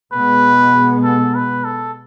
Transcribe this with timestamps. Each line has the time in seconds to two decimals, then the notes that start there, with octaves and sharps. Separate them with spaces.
0.12 B2 G#3 B3 B4
1.04 A4
1.35 B4
1.65 A4